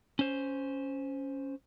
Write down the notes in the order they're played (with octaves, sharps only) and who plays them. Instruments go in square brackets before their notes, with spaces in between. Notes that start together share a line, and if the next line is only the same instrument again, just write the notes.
[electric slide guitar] C#4 C5